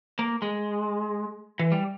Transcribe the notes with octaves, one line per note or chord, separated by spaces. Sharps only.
A#3
G#3
E3
G3